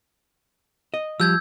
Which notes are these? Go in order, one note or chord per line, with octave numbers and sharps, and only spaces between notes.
D#5
F3 G3 E6 G6 G#6